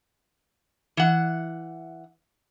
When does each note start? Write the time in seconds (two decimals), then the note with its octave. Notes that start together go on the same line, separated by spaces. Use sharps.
0.97 E3 F#5